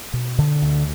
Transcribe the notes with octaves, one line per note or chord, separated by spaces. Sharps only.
B2
D3
D2